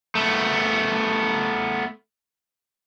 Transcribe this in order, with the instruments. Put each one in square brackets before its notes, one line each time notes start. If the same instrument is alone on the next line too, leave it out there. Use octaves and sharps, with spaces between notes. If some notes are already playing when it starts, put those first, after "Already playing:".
[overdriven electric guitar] A3 B3